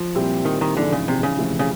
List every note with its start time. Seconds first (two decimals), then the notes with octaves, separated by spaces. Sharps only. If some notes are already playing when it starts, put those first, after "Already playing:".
Already playing: F3
0.15 A#2 G3 C4 E4 G4
0.45 D#3
0.61 D#3
0.77 A#1 G#2 D3 E3 G#3
0.92 C#3
1.08 C3
1.23 C#3
1.38 F2 C3 E3 A3 C4
1.59 C#3